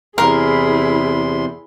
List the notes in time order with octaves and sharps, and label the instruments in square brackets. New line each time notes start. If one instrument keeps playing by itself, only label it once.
[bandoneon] E2 C3 C6 [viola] E4 G#4 [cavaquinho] A#4